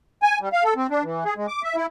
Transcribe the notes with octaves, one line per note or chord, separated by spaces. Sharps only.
G#5
G3
F5
A4
C4
D4
E3
G#4
G#3
D6
E5
E4